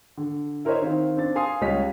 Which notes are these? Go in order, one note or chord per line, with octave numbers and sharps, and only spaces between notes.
D3
E4 A#4 C5 C#5 D#5 E5
D#3 C4 F5
C4 D4 A6
F5 G#5 C6 D#6 C7
C#2 G3 C#5 D#5 F5 B6